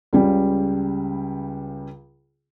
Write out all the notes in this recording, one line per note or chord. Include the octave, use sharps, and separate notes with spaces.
C#2 C#3 G3